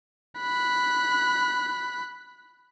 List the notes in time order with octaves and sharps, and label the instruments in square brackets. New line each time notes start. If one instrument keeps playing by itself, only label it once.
[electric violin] B5 F#6